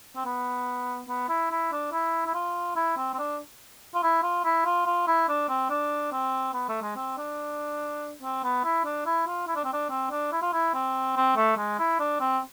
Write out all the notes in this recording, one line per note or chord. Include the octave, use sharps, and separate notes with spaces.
C4
B3
B3
E4
E4
D4
E4
E4
F4
E4
C4
C4
D4
F4
E4
F4
E4
F4
F4
E4
D4
C4
D4
C4
B3
A3
G#3
C4
D4
C4
B3
E4
D4
E4
F4
E4
D4
C4
D4
C4
D4
E4
F4
E4
C4
C4
A3
G#3
E4
D4
C4